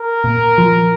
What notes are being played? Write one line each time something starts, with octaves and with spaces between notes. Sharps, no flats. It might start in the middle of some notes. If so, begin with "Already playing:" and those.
Already playing: A#4
A#2
F3